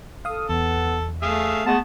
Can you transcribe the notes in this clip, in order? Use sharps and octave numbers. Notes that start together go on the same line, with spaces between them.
A4 F5 D#6
E2 B3 A4
A3 G#4 E5 F5
G#3 A3 B3 A5